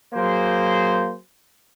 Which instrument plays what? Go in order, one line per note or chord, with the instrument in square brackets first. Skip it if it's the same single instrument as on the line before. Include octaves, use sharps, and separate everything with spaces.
[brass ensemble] F#3 A#3 G#4 C5